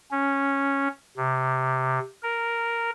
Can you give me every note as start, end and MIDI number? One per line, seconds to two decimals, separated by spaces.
0.11 0.88 61
1.17 1.99 48
2.23 2.91 70